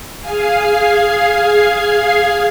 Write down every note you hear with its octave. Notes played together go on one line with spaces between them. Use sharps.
G#4 F5 G#5 C7